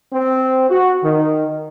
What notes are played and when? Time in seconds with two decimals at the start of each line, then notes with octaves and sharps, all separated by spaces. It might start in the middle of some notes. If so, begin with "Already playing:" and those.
0.11 C4
0.69 F#4
1.03 D#3